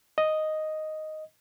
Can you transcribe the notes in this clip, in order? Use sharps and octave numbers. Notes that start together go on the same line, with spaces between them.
D#5